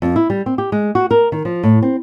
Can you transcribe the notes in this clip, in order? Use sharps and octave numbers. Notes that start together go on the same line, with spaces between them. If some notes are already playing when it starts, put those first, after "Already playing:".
F2
E4
G3
C4
G4
G#3
F#4
A#4
D#3
F3
A2
C4